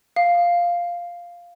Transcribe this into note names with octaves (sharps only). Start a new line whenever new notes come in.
F5